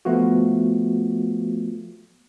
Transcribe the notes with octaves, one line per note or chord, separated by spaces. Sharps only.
F3 A3 B3 F4 F#4